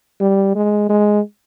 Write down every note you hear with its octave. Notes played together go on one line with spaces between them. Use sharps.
G3
G#3
G#3